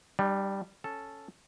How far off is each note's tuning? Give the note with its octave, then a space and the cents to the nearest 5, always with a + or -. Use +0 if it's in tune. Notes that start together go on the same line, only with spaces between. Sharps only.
G3 +0 D4 +45
C#4 +0 A4 +0